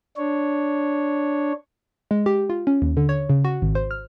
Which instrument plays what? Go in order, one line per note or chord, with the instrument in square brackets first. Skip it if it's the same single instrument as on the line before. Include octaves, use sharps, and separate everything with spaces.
[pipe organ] D4 C#5
[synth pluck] G#3
G4
F4
C#4
D#2
D3
C#5
C#3
F#4
G#1
C5
F6